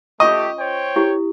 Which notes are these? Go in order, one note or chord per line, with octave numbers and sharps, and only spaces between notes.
A3 C#4 F4 G4 D#5 C#6
C5 C#5 G5
E4 G4